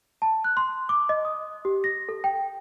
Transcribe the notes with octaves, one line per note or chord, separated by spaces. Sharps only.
A5
F#6
C6
D6
D#5
D#6
G4
A#6
A4
G5